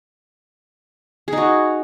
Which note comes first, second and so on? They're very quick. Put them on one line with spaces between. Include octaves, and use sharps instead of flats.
G#4 D#4 F#4